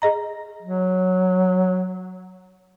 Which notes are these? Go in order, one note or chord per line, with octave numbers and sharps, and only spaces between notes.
G#4 D#5 A#5
F#3